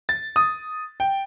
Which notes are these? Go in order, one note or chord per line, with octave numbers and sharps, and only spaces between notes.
A6
D#6
G5